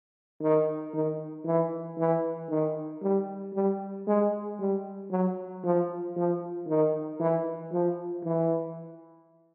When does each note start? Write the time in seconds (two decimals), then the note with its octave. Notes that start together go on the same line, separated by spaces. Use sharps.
0.41 D#3
0.94 D#3
1.45 E3
1.98 E3
2.50 D#3
3.03 G3
3.54 G3
4.07 G#3
4.60 G3
5.11 F#3
5.64 F3
6.16 F3
6.68 D#3
7.20 E3
7.73 F3
8.25 E3